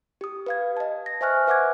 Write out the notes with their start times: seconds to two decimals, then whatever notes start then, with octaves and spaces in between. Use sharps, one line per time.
0.21 G4 D#6
0.46 B4 F5 G#6
0.77 D#5 A5
1.06 A#6
1.21 C5 E5 G#5 C#6 F6 F#6
1.47 B4 E5 F#5 D6 F#6 G#6